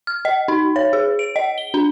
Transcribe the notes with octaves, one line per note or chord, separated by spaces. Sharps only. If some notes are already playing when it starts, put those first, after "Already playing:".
F6
D#5
D#4
C#5
G#4
D7
D#5
G7
D4